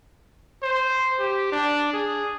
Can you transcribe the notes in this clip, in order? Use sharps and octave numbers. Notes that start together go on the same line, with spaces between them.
C5
G4
D4
G#4